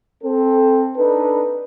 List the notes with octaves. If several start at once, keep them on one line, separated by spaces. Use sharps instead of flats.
C4 A4
D4 D#4 A4 B4